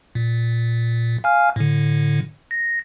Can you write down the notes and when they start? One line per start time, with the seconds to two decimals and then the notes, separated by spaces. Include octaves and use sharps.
0.15 A#2
1.24 F5 G#5 F6
1.56 A2 D3
2.51 A#6